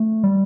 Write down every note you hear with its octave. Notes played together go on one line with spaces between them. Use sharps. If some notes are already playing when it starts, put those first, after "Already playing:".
Already playing: A3
G3